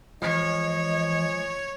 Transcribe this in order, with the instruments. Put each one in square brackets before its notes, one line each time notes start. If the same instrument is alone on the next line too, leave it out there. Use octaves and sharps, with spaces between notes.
[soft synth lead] E3 [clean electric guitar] F3 G#3 [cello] C#5 [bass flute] D#5